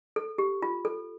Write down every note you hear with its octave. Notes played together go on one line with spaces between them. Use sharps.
A4
G4
F4
A4